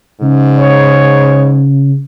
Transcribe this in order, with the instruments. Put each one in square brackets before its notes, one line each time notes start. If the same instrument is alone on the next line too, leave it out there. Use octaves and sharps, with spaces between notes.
[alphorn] G#2 [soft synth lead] C#3
[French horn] C#5